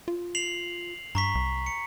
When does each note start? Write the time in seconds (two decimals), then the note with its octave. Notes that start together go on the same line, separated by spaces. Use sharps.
0.08 F4
0.35 C7 F7 F#7
1.15 G2 A#5 C#6 B6
1.35 C2
1.66 C#7